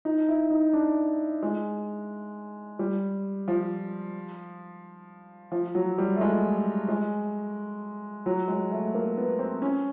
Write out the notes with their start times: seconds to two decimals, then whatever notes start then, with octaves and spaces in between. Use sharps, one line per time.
0.05 D#4
0.29 E4
0.51 D#4
0.73 D4
1.43 G#3
2.79 G3
3.48 F3
5.52 F3
5.75 F#3
5.98 G3
6.16 A3
6.21 G#3
6.88 G#3
8.26 F#3
8.48 G#3
8.71 A3
8.94 A#3
9.17 B3
9.39 C4
9.62 C#4